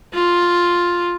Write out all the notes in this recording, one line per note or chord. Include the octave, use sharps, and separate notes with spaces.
F4